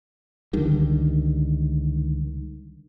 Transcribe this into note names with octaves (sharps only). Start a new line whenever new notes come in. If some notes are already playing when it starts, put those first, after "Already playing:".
C#2 D3 D#3 G3